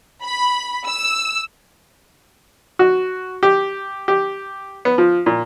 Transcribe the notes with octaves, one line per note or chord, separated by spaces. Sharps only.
B5
E6
F#4
G4
G4
B3
F3
A#2